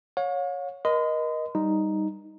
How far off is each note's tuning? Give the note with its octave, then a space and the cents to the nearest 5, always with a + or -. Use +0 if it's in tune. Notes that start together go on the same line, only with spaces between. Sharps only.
C#5 +0 F5 +45
A#4 +35 D#5 +0 C6 -40
G3 +0 D#4 +0